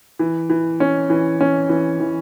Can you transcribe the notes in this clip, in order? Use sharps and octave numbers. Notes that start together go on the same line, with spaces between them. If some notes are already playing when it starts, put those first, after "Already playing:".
E3
E3
C#4
E3
C#4
E3
E3